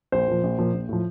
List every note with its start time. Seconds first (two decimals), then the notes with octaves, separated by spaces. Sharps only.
0.12 A#1 C5
0.28 A#2 F3
0.43 A#1
0.58 A#2 F3
0.73 A#1
0.89 A2 F3